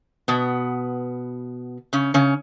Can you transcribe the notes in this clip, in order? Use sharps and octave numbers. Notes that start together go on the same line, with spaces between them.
B2 B3
C#3 C#4
C#3 C#4